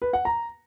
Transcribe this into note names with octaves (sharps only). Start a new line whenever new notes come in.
B4
F#5
A#5